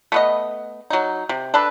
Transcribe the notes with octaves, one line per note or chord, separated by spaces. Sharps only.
A3 B3 D#5
F#3 D#4
C3
D4 A4 B4